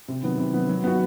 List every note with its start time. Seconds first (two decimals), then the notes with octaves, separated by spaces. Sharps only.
0.08 C3
0.23 D#3 F#3 B3
0.38 C3
0.53 D#3 F#3 B3
0.69 F#3
0.84 B3 D#4 F#4